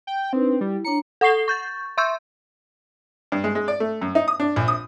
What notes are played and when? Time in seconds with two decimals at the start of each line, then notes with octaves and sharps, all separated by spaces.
0.07 G5
0.33 C4 D4 D#4 B4
0.61 G3 E4
0.85 D4 C#5 A#5 C#7
1.21 A4 F#5 C#6 C7 G7
1.48 C#6 G6 A6
1.98 E5 C6 C#6 E6 G6
3.32 G2
3.44 G#3
3.55 G#3
3.68 D5
3.80 A3
4.01 F#2
4.15 D#4
4.28 D#6
4.40 D4
4.56 A#1
4.68 D#6